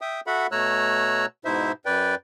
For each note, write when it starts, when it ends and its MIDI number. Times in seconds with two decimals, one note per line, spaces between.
0.01 0.20 76
0.01 0.20 79
0.01 0.20 87
0.27 0.47 66
0.27 0.47 69
0.27 0.47 76
0.27 0.47 78
0.27 0.47 83
0.52 1.26 47
0.52 1.26 57
0.52 1.26 73
0.52 1.26 82
0.52 1.26 88
0.52 1.26 90
1.45 1.72 44
1.45 1.72 47
1.45 1.72 63
1.45 1.72 64
1.45 1.72 72
1.45 1.72 76
1.86 2.15 42
1.86 2.15 71
1.86 2.15 74
1.86 2.15 79